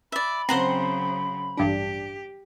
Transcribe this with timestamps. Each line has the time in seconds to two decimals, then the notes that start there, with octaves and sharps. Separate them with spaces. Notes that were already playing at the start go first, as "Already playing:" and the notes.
0.12 D5 E5 B5
0.49 C#3 F#3 C4 C5 F#5 A#5 C6
1.57 A1 G2 D4 G4